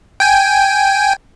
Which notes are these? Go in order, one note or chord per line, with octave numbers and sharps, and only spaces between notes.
G5 G#5